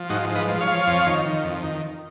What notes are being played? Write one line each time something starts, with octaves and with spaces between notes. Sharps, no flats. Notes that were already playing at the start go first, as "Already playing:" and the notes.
Already playing: F3
G#2 D#4 F#4
F3
B4 D#5
F3
C#5 F5
F3
F2
D#3
D#3
F2
D#3